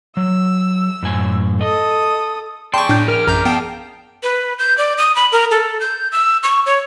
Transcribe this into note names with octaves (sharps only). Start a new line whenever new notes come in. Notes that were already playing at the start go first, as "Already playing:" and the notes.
F#3 E6
F#2 A2 G#5
A4 D#5 D#6
G#4 D5 G5 A5 C6 C#6
A2 D4 G6
A#4 F6
A#1 F#2 A#4 A#5 G6
B3 F5 G5 A5
B4
G6
D5
D#6
B5
A#4
A4
G6
E6
C#6
C#5